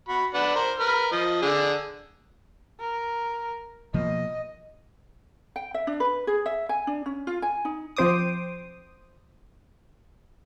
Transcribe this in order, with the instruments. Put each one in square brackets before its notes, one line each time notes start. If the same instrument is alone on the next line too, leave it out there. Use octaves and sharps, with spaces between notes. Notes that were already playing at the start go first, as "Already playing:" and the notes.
[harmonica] F#4 B5
D4 B4 F#5
A#4 C5
A#4 B4 F6
F3 D#5
D3 D4 G#4
[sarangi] A#4
[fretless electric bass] B2 F3 A#3 [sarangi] D#5
[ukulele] G5
E5
D4
B4
G#4
E5
G#5
D4
C#4
F4
G#5
D#4
[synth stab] F3 C4 C5 D6 D#6